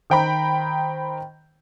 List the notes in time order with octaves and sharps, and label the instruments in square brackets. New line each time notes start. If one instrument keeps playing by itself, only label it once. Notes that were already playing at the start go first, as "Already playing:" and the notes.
[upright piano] D#3 C5 G5 A#5 B5 G6